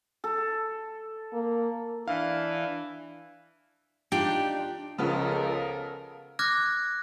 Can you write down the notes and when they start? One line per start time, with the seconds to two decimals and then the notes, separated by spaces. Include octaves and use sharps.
0.24 A4
1.33 A#3
2.08 E3 D4 F5
4.12 D4 D#4 F4 G4
4.98 C#2 C#3 F3 B3 A4 A#4
6.39 D6 F6 F#6 G#6 A#6